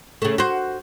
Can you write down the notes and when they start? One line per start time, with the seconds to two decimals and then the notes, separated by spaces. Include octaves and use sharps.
0.22 C#3 A3
0.38 F#4 C5